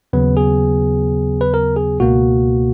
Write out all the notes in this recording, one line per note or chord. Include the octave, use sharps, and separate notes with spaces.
D#2 C#3 F#3 B3 B4
G#4
B4
A#4
G#4
C#2 B2 A#3 F#4